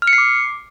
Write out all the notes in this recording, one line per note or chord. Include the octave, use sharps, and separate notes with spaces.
F6
C#7
C7
D6